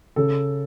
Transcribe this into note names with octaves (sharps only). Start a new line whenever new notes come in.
C#3 A4